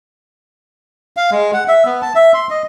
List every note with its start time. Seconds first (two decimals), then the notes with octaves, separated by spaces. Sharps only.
1.17 F5
1.31 G#3
1.54 F#5
1.68 E5
1.86 B3
2.02 A5
2.15 E5
2.34 C6
2.50 D#5